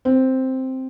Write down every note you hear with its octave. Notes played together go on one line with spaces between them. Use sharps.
C4